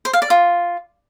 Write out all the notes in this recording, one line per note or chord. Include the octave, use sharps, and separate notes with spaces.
C5
F5
D5
F4